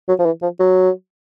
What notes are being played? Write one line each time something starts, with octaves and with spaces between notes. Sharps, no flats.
F#3
F3
E3
F3
F#3